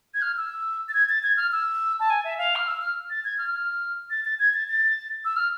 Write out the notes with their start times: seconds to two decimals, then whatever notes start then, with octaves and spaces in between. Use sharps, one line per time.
0.14 G#6
0.22 F6
0.37 E6
0.89 A6
0.94 G#6
1.09 A6
1.23 G#6
1.37 F6
1.52 E6
2.00 A5
2.10 G#5
2.24 E5
2.38 F5
2.56 F6
2.67 E6
2.82 F6
3.10 A6
3.24 G#6
3.38 F6
3.52 F6
4.10 A6
4.25 A6
4.39 G#6
4.54 A6
4.68 A6
5.25 E6
5.36 F6